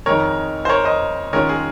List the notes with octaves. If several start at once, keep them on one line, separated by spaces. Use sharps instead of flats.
F2 D#3 G#3 D#4 A#4 C#5
C5
A#4 C#5
C5 D#5
D#3 G#3 C#4 F4 A#4 C#5
G#4